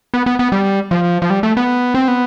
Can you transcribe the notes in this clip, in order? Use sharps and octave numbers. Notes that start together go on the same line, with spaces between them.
B3
B3
B3
G3
F3
F3
G3
A3
B3
C4
B3